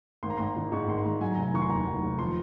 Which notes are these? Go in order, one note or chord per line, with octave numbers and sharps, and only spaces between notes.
G#1 C6
A#5
G#1 C6
D#3
G#2 C#6
G#1 C6
C6
G#1 A#5
F#3 G#5
F1 A#5
G#5
D#3 C#6
C6
D#2 A#5
F#3
F1
F3 C6